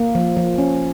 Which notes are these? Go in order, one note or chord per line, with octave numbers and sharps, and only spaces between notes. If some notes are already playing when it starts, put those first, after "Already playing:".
Already playing: A#3
F3
F3
C#4